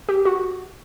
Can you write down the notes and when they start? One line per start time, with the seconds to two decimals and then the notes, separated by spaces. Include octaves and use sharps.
0.09 G4
0.25 F#4